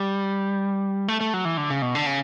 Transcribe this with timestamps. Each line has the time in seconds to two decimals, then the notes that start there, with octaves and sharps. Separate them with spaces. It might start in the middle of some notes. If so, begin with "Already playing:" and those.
Already playing: G3
1.08 A3
1.21 A3
1.34 F#3
1.45 E3
1.57 D3
1.70 C#3
1.82 B2
1.95 D3
2.06 C#3